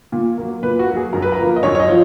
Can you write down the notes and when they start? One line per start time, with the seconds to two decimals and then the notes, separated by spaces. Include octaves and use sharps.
0.12 A#2
0.38 F#3 A#3
0.63 A#2 B4
0.79 F#4
0.87 F#3 A#3
0.96 G#4
1.13 F#2 A#4
1.22 B4
1.32 A#4
1.38 F3 A#3
1.56 D#5
1.63 F#2 C#5
1.75 C#5
1.80 D#5
1.88 F3